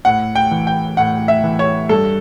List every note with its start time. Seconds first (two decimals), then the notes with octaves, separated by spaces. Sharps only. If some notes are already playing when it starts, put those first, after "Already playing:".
0.05 A2 F#5
0.35 G5
0.51 E3
0.67 G5
0.97 A2 F#5
1.28 E5
1.44 E3
1.59 C#5
1.89 G2 A4